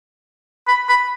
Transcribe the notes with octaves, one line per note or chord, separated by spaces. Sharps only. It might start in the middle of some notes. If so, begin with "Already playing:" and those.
B5
B5